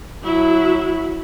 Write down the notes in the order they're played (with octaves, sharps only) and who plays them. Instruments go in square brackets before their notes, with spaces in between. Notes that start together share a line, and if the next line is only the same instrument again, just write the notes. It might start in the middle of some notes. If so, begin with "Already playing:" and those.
[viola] F#3 E4